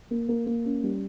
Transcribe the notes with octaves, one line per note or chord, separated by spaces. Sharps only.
A#3
A#3
A#3
C#4
G3